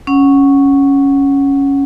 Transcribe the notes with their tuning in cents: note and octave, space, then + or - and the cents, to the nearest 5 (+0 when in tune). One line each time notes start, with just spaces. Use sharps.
C#4 +0 F#5 +0